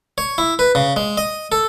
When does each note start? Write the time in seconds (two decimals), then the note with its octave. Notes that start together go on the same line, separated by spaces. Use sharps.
0.18 C#5
0.38 E4
0.59 B4
0.75 C#3
0.96 G#3
1.17 D#5
1.52 A4